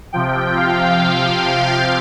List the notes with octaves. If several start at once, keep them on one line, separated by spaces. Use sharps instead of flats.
C3 F3 G5
F5